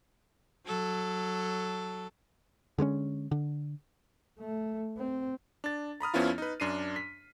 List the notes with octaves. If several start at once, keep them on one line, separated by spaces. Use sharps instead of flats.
F#3 A4
D3 G#3 A#3 C#4
D3
A3
C4
D4 A6
A#5 B5 D#6 F6
F2 F3 B3 C#4 E4 F4
D#4 B4
F#2 D4 C7 D#7
B6